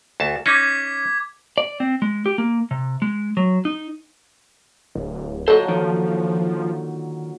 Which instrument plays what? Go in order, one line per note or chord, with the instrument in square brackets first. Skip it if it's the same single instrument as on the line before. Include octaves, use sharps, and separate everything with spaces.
[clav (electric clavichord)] D2 A5
[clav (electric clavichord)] C#4 D#4 [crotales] D6 G#6 B6
[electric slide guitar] D5
C4
G#3
G4
A#3
C3
G#3
F#3
D#4
[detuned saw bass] D1
[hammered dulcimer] A#2 D3 F#3 [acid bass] A4 [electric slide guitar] C5 D#5
[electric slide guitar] D#3 D#4 [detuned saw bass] F3